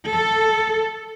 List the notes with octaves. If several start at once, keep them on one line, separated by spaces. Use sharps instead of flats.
A4